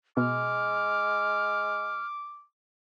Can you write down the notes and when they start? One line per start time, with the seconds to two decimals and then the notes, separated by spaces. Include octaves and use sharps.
0.17 B2 G#3 D6 F6